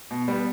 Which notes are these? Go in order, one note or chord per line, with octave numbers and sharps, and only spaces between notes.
B2
G3 B3